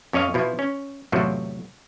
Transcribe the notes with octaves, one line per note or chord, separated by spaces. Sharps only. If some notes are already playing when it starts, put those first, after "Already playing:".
F2 C#4 C#5 D#5 F5
B2 F3 E4
C#4
E2 A2 C3 F3 F#3